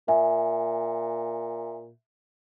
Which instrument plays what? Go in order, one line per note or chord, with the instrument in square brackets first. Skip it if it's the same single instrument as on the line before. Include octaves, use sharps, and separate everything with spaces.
[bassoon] A#2 [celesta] E5 G#5